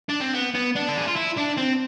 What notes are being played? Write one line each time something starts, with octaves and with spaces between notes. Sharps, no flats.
D4
C4
B3
B3
D4
A4
G#4
F4
E4
D4
C4